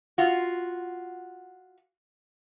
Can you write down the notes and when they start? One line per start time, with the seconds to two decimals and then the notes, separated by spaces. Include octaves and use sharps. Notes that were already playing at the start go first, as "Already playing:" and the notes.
0.18 F4 F#4